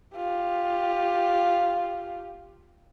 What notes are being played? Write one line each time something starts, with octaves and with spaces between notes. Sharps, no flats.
F4 G4